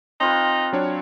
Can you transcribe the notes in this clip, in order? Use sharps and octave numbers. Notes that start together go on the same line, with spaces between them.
C4 D#4 F4 B4
F#3 D4 C#5